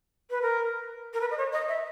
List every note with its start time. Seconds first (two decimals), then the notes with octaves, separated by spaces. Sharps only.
0.30 B4
0.42 A#4
1.14 A#4
1.21 B4
1.31 D#5
1.38 C#5
1.53 D#5
1.68 E5